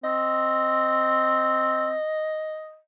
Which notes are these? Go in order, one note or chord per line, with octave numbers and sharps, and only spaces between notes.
C4 D#5